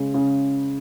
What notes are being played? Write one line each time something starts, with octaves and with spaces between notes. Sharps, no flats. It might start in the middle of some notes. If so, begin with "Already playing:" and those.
Already playing: C#3 G#3
C#3